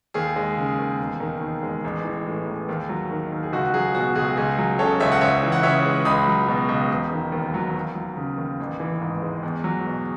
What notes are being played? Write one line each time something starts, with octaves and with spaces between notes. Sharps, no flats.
D#2 G#4
G#3
C#3
D#2
E1
D#3
D#2
G#3
A1
E3
A2
A1
D#2
F#3
D#3
D#2
G#4
C#2 F#4
F#3 G#4
B2 F#4
C#2 G#4
C#2 G#4
F#3
C#3 A4 C#5
C#2 C#5 E5
F#5
C#2 C#5 E5
E3
F#5
C#3 C#5 E5
G#3
C#2 B5 D#6
F#3
B2
C#2
E1
D#3
D#2
F#3
D#2
F#3
C#3
D#2
A1
E3
G#2
G#3
E2
F#3
B2